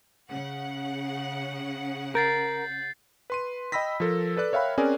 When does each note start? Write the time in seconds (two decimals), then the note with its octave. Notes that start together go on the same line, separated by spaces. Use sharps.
0.30 C#3 F#5
2.15 A#4 G6 A6 C7
3.30 B4 C6 D#7
3.72 D#5 G5 B5 E6 A#6 B6
4.00 F3 A4 A#4
4.37 A4 B4 D5 F#6
4.52 A#4 C#5 E5 F5 G5 B5
4.78 C4 C#4 G#4 A#4 D5 G#5